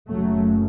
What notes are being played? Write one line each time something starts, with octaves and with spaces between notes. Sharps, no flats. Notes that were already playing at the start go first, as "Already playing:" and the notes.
F#1 F#2 C#3 F#3 A3